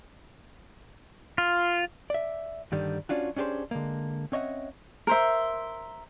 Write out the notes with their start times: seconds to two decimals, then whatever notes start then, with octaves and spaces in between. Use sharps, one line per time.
1.38 F4
2.10 D5 E5
2.72 G2 D3 D#3 G3
3.09 C#4 D4 F4 F#4
3.36 C#4 D4 G4 G#4 C5
3.71 D3 G#3 A#3
4.32 C4 C#4 C#5 D#5 E5 F#5
5.07 A#4 C5 E5